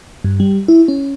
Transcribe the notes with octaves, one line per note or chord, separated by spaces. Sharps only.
G2
G3
E4
C#4